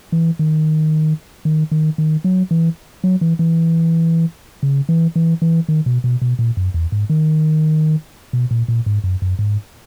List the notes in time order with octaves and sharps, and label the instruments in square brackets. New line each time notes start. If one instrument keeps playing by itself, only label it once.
[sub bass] E3
D#3
D#3
D#3
D#3
F#3
E3
F#3
E3
E3
C#3
E3
E3
E3
D#3
B2
B2
B2
A#2
F#2
E2
G#2
D#3
B2
A#2
A#2
G#2
F#2
F#2
G#2